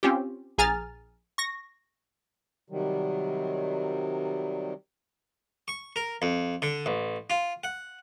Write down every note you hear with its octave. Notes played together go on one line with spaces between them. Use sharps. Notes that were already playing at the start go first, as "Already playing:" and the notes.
C4 C#4 F4 G4
A#1 G#4 G#5 A#5 F6 A6
C#6 A#6
C3 D#3 F#3 G3
C#6
A#4
F2
D3
A1
F4
F#5